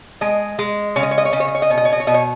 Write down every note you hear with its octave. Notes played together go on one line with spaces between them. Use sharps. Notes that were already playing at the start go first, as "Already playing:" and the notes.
G#3 D#5
G#3
C#3 C#5
D#5
C#5
D#5
C#5
C#3 D#5
C#5
D#5
C#5
D#5
B2 C#5
D#5
C#5
D#5
C#5
B2 D#5
C#5